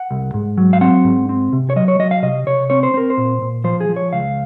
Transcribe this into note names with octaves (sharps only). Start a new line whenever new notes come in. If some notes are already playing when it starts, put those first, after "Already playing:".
Already playing: F#5
C2
G#2
F#3
F5
C4 F#5
G#2
C4
C3
C#5
F#3 D#5
C#5
F#3 D#5
F5
C3 D#5
C3 C#5
C4 C#5
C5
C4 A#4
C5
A#2
A#2
F3 C5
G#4
F3
C#5
C#2 F5